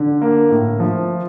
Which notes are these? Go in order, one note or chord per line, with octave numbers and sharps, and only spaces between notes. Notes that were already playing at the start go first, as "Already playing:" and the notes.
Already playing: D3
A#3
A2
F3